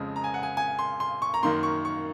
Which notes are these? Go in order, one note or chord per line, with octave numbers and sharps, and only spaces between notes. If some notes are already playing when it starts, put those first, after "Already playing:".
Already playing: F2 C#3 F3 G#3
A#5
G#5
F#5
G#5
G#5
C6
C6
C#6
A#5
F#2 D#3 A#3 C6
C#6
C#6